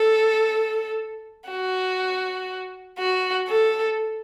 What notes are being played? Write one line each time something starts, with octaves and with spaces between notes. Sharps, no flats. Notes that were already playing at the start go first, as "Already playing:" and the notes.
Already playing: A4
F#4
F#4
A4